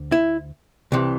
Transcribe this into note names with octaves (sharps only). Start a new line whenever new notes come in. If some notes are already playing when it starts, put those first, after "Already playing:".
Already playing: D2 D3
E4
C2 C3 E3